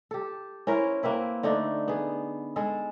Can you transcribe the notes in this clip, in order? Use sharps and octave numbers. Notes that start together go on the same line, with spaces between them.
G4 A4
C#4 E4 A#4 C5
A#3 C4 E4 B4
D3 A3 D4 D#4
B3 G#4
G#3 G#4 A4